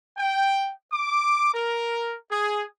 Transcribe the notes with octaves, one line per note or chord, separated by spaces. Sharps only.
G5
D6
A#4
G#4